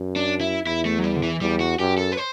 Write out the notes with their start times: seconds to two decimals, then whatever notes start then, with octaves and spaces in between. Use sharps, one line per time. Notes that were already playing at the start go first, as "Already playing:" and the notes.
Already playing: F#2
0.16 D4
0.41 E4
0.66 E2 E4
0.85 A3
0.99 F#3
1.04 G3
1.16 D3
1.23 E3
1.41 E2 G3
1.60 F#4
1.79 F#2 G4
1.98 A4
2.12 B4
2.17 C5